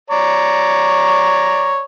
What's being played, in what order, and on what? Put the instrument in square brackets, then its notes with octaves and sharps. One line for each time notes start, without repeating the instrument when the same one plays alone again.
[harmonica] C#5 D5 A#5